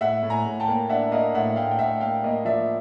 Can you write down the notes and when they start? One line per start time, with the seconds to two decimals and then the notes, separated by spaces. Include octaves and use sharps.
0.01 A2 E5 F#5
0.23 A2
0.30 G#5 A#5
0.46 A2
0.60 G5 A5
0.68 A#3
0.90 D4 E5 F#5
1.12 A#3 D#5 F5
1.34 A2 E5 F#5
1.56 A2 F5 G5
1.71 G5
1.79 A2 E5 F#5
2.01 A#3 F5 G5
2.24 A#3 D#5
2.45 F3 D5 E5